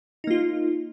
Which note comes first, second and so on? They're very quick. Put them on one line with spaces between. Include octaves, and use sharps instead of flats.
D#4 A#3 F4